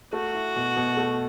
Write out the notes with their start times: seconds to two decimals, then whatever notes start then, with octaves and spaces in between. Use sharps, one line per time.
0.13 A3 F#4
0.34 E4
0.56 B2
0.76 B2
0.97 A3